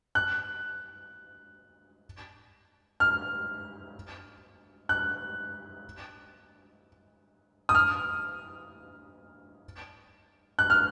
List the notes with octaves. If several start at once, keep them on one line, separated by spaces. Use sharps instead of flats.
F#6
F6
F#6
D#6
F6
F#6
F6